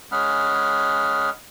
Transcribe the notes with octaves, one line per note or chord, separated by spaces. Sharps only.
G#3 C#4 G#4 F#5 B5 F6